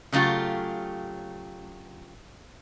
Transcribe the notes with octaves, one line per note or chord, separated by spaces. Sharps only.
C#3 F#3 A3 F4 G4